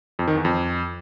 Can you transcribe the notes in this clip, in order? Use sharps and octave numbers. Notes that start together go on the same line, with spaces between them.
F2
D#3
E2
F2